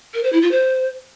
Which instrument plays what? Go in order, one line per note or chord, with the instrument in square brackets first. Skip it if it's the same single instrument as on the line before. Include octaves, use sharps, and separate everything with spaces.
[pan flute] A#4
C5
E4
F4
C5